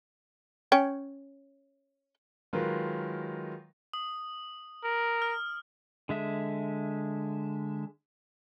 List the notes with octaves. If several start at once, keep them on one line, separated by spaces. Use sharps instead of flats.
C#4 C#5 G5
D#3 F#3 G#3 F4 A#4 B4
D#6
A#4
F6
D3 G#3 E5